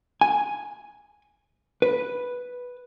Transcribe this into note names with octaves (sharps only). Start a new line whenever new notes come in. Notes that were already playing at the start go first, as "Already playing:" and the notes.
G#5
B4